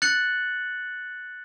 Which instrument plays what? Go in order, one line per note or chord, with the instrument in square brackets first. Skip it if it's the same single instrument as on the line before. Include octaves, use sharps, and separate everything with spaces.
[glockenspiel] F#6 A6 C#7 F#7